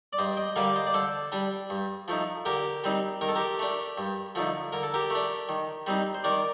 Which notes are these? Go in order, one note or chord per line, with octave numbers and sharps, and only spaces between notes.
D5
G2 C5 D#5
D#5 G5
D3 G3 A#3 D5 F5
C5 D#5
D5
D3 A4 C5
G3 D4
G2
F3 A3 D#4
D3 G4 A#4
G3 C4 D#4
D#3 A#4
A4
G4 A#4
A3 D4
G2
D3 F3 A3 D#4
D3 A#4
A4
G4 A#4
A3 D4
D#3
G3 C4 D#4
C5
D#3 A#4 D5